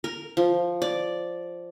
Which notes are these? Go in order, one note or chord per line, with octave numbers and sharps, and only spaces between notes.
A#4
F3
D5